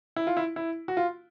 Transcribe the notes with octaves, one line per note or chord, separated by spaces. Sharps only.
E4
F4
E4
E4
F#4
F4